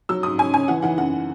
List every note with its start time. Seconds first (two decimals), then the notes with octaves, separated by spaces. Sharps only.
0.09 F#3 E6
0.23 G#2 D#6
0.38 C#4 G#5
0.53 C#4 G#5
0.68 E3 F#5
0.82 E3 F#5
0.97 F#2 F#5